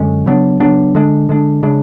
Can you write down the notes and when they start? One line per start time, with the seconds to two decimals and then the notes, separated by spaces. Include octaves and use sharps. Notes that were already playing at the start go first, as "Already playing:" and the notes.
Already playing: F#2 D3 G#3 C#4
0.26 C#3 F#3 B3 D4
0.60 C#3 F#3 B3 D4
0.95 D3 G#3 D4
1.29 D3 G#3 D4
1.63 C#3 G#3 D4